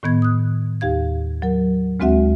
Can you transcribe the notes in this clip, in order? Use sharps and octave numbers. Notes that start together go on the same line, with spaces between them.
A2 D#3 B3 G#6
D#6 F#6
D#2 G4 F5 G#6
F#3 A#4
D2 G#3 C4 F#4 E5 F#5